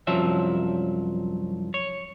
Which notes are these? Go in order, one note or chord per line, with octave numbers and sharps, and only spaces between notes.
C2 F#2 F3 F#3 E5
C#5